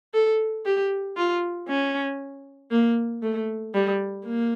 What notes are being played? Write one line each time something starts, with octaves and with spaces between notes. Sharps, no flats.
A4
G4
F4
C#4
A#3
A3
G3
A#3